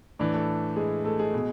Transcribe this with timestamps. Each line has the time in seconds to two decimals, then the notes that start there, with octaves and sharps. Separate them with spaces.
0.19 A2 E3 D4 D5
0.34 A3 A4
0.76 G#3 G#4
1.05 A3 A4
1.19 G#3 G#4
1.34 B2